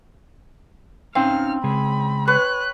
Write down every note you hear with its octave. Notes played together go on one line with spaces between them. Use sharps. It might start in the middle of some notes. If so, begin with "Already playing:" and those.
C4 C#4 D#4 F5 F6
C#3 G#3 G#4 B5
B4 C#5 F#6